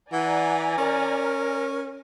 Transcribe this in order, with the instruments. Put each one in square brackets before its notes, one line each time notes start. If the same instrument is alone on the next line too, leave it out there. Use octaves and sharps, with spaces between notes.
[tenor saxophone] E3 [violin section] D5 G#5 A#5 [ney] F#5
[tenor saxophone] C#4 [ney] A#4